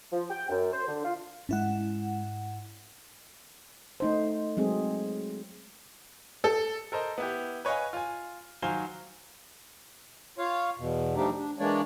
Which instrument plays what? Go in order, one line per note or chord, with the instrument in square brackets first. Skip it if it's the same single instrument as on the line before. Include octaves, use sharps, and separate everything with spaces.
[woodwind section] F3
G5
F#2
C5
D3
F4
[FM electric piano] G#2 E4 F#5 [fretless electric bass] G#3 C#4
[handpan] A3 D#4 C5
F#3 G#3 C4 G#4
[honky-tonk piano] A4
[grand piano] A4 A#4 C5 D#5
B3 E4 G4
B4 C#5 D#5 F5 G#5
F4 G#5
D#3 F#3 C5 F5 G#5 G7
[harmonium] F4 C#5 F5
E2 B2
F3 G3 A3 D4 D#4 G4
D4
E3 G#3 A#3 D4 C#5 D5